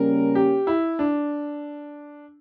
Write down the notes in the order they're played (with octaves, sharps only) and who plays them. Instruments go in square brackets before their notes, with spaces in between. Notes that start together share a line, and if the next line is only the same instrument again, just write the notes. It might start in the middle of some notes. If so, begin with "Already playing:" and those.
Already playing: [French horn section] C#3 G3 A#3 C#4 [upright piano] A#4
[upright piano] G4
E4
D4